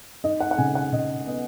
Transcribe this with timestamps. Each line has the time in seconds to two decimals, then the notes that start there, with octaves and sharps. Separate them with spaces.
0.24 D#4 D#5
0.40 F#5
0.51 F#5
0.58 C#3 G#5
0.75 F#5
0.93 C#3 D#5
1.27 B3 D#5